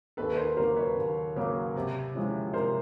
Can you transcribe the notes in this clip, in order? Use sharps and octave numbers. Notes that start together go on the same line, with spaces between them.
D#2 A4 B4
B4
A#4 C5
C#3 F#3 A#3 A#4 C5
B4 C#5
D#2
C#3 F#3 A#3
C3
F3 G#3 C#4 E4
C3 A#4 C5